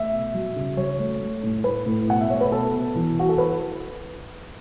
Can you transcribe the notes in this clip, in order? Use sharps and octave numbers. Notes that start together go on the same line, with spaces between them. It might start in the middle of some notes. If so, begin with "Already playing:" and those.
Already playing: A3 E5
B2
F#3
C#3
F#3 C#5
A3
A3
A2
A3 B4
A2
B2 F#5
E5
A3 C#5
B4
B2 A4
B2
E3
E4 F#4
A4
E4 B4